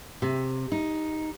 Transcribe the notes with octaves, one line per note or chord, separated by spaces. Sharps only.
C3
D#4